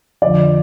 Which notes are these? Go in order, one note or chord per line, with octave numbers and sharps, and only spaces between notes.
F2 D3 F3 D5